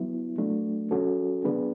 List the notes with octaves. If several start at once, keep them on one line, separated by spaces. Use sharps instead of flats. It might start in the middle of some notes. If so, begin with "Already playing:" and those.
Already playing: F#3 B3 E4
F#3 A3 D4
F#3 C#4 F#4 A4
F#3 B3 D4 G#4 B4